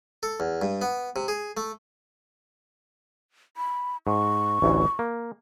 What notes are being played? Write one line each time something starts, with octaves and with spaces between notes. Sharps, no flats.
A4
E2
G2
B3
C3
G#4
A3
B5
G#2 C#6
A1 D2 E3
A#3